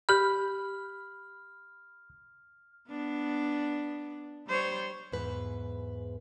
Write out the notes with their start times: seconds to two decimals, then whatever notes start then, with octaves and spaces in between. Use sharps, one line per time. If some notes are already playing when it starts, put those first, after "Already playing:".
0.09 G4 B5 F6 G6
2.88 B3 D4
4.47 G3 C5 C#5
5.12 E2 G#2 B4